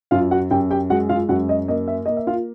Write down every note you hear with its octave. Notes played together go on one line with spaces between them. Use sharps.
F#2 F4 F5
F#4 F#5
F#2 G4 G5
G4 G5
G#3 F#4 F#5
F4 F5
F#2 F#4 F#5
D#5
A#3 D#5
E5
A#3 D#5
E5
F4 F5